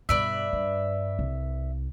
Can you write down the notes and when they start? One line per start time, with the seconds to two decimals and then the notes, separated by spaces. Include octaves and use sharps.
0.09 G2 B2 B4 D5 E5
0.53 G2
1.19 C2